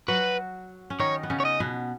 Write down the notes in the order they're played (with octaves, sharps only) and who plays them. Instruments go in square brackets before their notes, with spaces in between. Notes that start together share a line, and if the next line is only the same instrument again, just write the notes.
[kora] F#3 F#4 [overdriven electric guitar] B4
[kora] C#4
[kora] D#3 D#4 [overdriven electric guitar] C#5
[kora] B3
C#3 C#4
[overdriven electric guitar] C#5
D#5
[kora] B2 B3